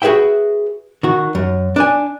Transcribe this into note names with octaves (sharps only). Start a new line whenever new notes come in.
F#4 G#4 B4 E5 G5
D#3 F#4
F#2
D4 D5 G#5